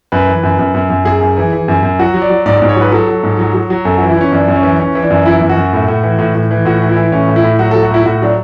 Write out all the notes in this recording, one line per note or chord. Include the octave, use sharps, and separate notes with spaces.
F#2 B4
E3
F#2
F#2
F#2
F#2
F#2 G#4
F#2
E3
E3
F#2
F#2
F#3 F#4
F#3
D5
F#3
G#2 D5
D5
G#2
C#5
F#3 B4
F#3 A4
F#3
G#2
F#3
F#3
F#3
F#2 A4
F#4
E3
E4
E3 C#4
F#2 D4
F#2
C#4
E3
E3 C#4
E3
D4
F#2
E3 E4
F#2
F#4
F#2
A2
A2
E3
A2
A2
E3
A2 F#4
E3
E4
E3
A2 C#4
A2
E4
A2
F#3 F#4
A4
F#3
F#4
A2 E4
A2 F#4
F#3 D4